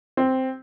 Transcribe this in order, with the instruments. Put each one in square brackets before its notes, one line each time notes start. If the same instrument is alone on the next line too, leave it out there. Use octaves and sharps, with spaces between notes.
[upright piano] C4